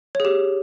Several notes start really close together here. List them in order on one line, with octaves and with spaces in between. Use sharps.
C#5 G#4 G4